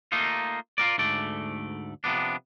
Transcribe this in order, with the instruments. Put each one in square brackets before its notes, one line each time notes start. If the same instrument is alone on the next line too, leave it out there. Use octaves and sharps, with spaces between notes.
[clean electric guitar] A3 A#3 D#4 F4
F4 F#4 A#4 D5
D2 G#2 A3 D5
C3 F3 B3 D4